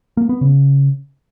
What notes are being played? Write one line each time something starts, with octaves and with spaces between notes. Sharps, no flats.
A#3
B3
C#3